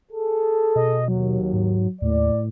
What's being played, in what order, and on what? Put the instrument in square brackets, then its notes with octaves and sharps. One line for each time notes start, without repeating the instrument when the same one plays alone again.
[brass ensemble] G#4 A4
[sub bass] B2 [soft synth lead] D#5
[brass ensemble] D#2 [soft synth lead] F#3
[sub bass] G#2
[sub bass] D#2 [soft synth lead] A2 [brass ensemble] D5